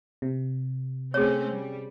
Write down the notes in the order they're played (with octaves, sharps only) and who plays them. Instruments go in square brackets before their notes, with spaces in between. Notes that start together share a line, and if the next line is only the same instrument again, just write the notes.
[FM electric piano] C3
[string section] A3 C4 C#4 [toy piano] G#4 C#5
[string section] G3